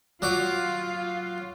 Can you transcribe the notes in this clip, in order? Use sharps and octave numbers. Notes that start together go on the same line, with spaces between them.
F#3 F4 D6